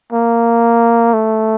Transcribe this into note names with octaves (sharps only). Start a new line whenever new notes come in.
A#3
A3